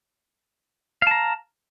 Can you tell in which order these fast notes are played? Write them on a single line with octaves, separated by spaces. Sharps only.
F5 A5 A#5